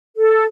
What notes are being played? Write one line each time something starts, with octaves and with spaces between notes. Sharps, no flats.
A4